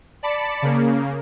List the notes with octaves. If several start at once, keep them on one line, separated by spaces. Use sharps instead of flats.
D5 A5 B5 C#7
C#3 A#3